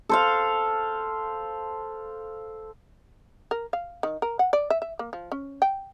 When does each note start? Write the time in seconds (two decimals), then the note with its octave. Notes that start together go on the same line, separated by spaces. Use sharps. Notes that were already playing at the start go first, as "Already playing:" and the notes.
0.09 A4 C5 F5
3.51 A#4
3.73 F5
4.03 D#3
4.22 A#4
4.39 F#5
4.53 D5
4.70 E5
4.82 E5
4.99 A#3
5.13 F3
5.32 C#4
5.62 G5